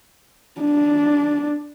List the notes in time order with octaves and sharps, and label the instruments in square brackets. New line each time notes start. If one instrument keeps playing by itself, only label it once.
[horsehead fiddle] D4